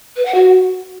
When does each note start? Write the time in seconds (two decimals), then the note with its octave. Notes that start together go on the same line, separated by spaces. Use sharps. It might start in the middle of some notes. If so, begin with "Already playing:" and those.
0.16 B4
0.25 F#5
0.35 F#4